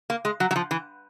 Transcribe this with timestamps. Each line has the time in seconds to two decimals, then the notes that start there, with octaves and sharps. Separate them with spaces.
0.10 A#3
0.25 G#3
0.40 F#3
0.51 F#3
0.56 F3
0.71 E3